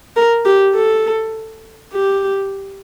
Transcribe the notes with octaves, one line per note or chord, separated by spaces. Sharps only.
A#4
G4
A4
G4